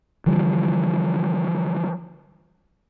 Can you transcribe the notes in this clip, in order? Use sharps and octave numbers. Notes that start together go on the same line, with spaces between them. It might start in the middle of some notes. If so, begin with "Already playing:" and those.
D3 E3 F3 G3